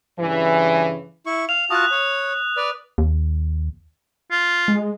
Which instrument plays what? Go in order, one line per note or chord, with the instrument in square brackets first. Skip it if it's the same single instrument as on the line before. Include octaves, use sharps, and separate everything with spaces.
[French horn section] G2 C#3 E3
[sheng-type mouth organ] E4 C#6
[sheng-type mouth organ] F5 [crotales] F7
[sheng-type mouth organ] F4 F#4 A5 [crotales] D#6 F#6
[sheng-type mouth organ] C#5
B4 D5
[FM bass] D#2
[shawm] F4
[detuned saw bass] G#3